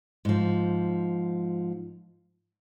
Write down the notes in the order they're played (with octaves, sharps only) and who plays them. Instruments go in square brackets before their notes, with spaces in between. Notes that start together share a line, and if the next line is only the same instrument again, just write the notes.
[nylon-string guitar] G#2 F3